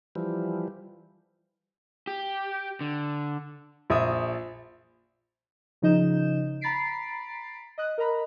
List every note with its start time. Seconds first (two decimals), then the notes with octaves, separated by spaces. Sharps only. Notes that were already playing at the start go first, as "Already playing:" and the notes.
0.15 E3 F3 G3
2.07 G4
2.81 D3
3.90 A#1 E5 D#6
5.82 C#3 F3 D#4 D#5 G6 E7
6.61 A#5 B5 A6 B6 C7 D7
7.78 D#5 D#6 F#6
7.98 A#4 D#5 A#5 B5